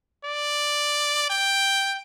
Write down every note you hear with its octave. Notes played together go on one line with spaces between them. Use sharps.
D5
G5